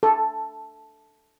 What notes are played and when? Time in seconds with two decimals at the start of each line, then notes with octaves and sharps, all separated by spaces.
0.03 A4